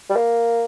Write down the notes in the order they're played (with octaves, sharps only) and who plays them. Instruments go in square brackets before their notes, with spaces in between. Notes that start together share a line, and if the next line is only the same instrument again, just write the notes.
[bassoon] G3
A#3